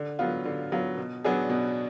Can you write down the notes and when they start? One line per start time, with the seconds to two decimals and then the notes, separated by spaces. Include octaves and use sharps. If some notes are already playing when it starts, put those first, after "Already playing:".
Already playing: D3
0.19 F#3 B3 F4
0.45 D3
0.72 F#3 B3 F4
0.98 B2
1.24 F#3 B3 D4 G#4
1.50 B2